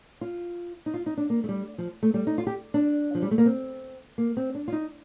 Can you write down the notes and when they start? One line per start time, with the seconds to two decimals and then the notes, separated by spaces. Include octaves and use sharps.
0.21 F4
0.86 D#4
0.94 F4
1.06 D#4
1.17 D4
1.30 A#3
1.44 A3
1.49 G3
1.78 F3
2.03 A3
2.14 G3
2.27 D#4
2.38 F4
2.47 G4
2.74 D4
3.15 F3
3.22 G3
3.31 A3
3.38 A#3
3.46 C4
4.18 A#3
4.37 C4
4.55 D4
4.68 F4
4.72 D#4